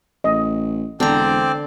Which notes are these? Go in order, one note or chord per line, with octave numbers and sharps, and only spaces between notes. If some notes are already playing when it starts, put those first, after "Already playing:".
A1 D#5
E1 D3 C4 C5 D5 A#5